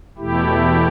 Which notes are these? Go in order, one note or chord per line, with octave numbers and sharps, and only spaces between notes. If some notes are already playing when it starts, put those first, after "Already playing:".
E2 B2 A3 E4 G4